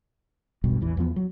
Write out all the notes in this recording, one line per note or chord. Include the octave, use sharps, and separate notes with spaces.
E1 B1 G2 B2
A1 E2 E3
E2 F3 B3
F#3